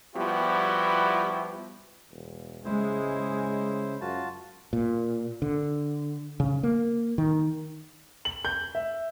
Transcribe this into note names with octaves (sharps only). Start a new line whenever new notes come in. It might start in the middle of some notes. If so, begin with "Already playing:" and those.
F3 G3 B3 E4 F#4 G4
E1
C#3 G#3 E4 C5
F#2 F4 F#4 A5
A#2
D3
C#3
A#3
D#3
F#7
G6
E5